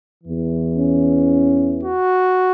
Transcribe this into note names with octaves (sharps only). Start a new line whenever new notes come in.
E2 E3
C#4
F#4